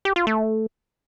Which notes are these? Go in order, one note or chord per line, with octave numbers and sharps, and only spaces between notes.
G4
F4
A3